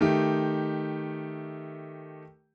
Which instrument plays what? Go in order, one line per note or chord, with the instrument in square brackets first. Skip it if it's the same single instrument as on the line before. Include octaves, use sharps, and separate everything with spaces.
[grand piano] D#3 A3 G4